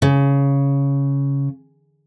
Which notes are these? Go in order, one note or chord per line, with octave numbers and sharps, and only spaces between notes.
C#3